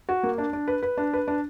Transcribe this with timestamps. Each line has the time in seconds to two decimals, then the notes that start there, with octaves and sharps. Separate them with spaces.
0.09 F#4
0.23 A#3
0.38 D4
0.53 D4
0.68 B4
0.83 B4
0.97 D4
1.13 B4
1.28 D4